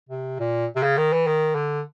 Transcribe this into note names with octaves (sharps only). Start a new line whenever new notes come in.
C3
A#2
C3
C#3
D#3
E3
D#3
D3